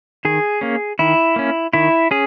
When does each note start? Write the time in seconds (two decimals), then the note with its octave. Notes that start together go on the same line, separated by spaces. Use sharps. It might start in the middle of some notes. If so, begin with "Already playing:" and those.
0.25 D#3 G#4
0.61 A#3 C#4
0.99 D#3 E4
1.36 A#3 C#4
1.73 D#3 E4
2.11 C#4 G#4